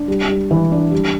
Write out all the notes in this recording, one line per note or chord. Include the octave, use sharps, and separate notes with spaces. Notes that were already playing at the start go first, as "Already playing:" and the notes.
Already playing: D4
G3
G3
E3
D4
G3